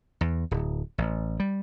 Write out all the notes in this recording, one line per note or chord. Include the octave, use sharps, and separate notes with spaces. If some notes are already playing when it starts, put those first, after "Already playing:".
E2
D1
A1
G3